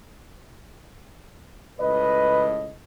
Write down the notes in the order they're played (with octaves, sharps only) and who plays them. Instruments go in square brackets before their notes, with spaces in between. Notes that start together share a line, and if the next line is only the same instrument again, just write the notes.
[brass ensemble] C#2 A2 D#5 [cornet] B4